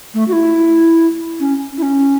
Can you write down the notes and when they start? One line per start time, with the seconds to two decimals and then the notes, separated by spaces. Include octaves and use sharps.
0.14 A3
0.28 F#4
0.33 E4
1.40 C#4
1.78 E4
1.82 C#4